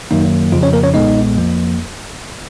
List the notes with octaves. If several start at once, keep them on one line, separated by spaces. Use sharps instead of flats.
F#2 D#3 F#3 A#3 D#4
F2 C#3 F3 F4
C#4 C#5
A#3 A#4
C#4 C#5
B1 A#2 G#3 B3 D#4 D#5
F2 F3 A#3